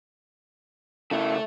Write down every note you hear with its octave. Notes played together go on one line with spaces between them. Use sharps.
C#3 E4 A4 E5